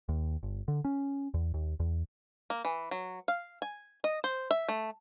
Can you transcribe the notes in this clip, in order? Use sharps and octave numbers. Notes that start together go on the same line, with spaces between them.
D#2
G1
D3
C#4
E2
D#2
E2
A#3
E3
F#3
F5
G#5
D#5
C5
E5
A3